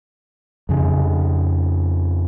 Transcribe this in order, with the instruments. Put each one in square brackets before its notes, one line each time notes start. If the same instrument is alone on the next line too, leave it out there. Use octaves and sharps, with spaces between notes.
[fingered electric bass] F2 C#3